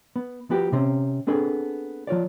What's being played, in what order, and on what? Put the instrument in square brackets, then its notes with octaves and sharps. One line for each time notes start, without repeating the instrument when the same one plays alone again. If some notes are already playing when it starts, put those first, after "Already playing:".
[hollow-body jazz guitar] B3
F3 B3 F#4 G4
C3 C4 C#4
B3 C4 D4 G#4 A4
F3 F4 C#5 D5